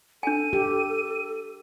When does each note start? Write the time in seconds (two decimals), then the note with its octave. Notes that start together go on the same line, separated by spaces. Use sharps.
0.23 D4 A4 G#5 D#7
0.53 G4